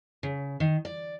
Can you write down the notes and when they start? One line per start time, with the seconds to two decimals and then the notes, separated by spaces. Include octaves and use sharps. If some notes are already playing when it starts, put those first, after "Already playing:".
0.23 C#3
0.60 D#3
0.85 D5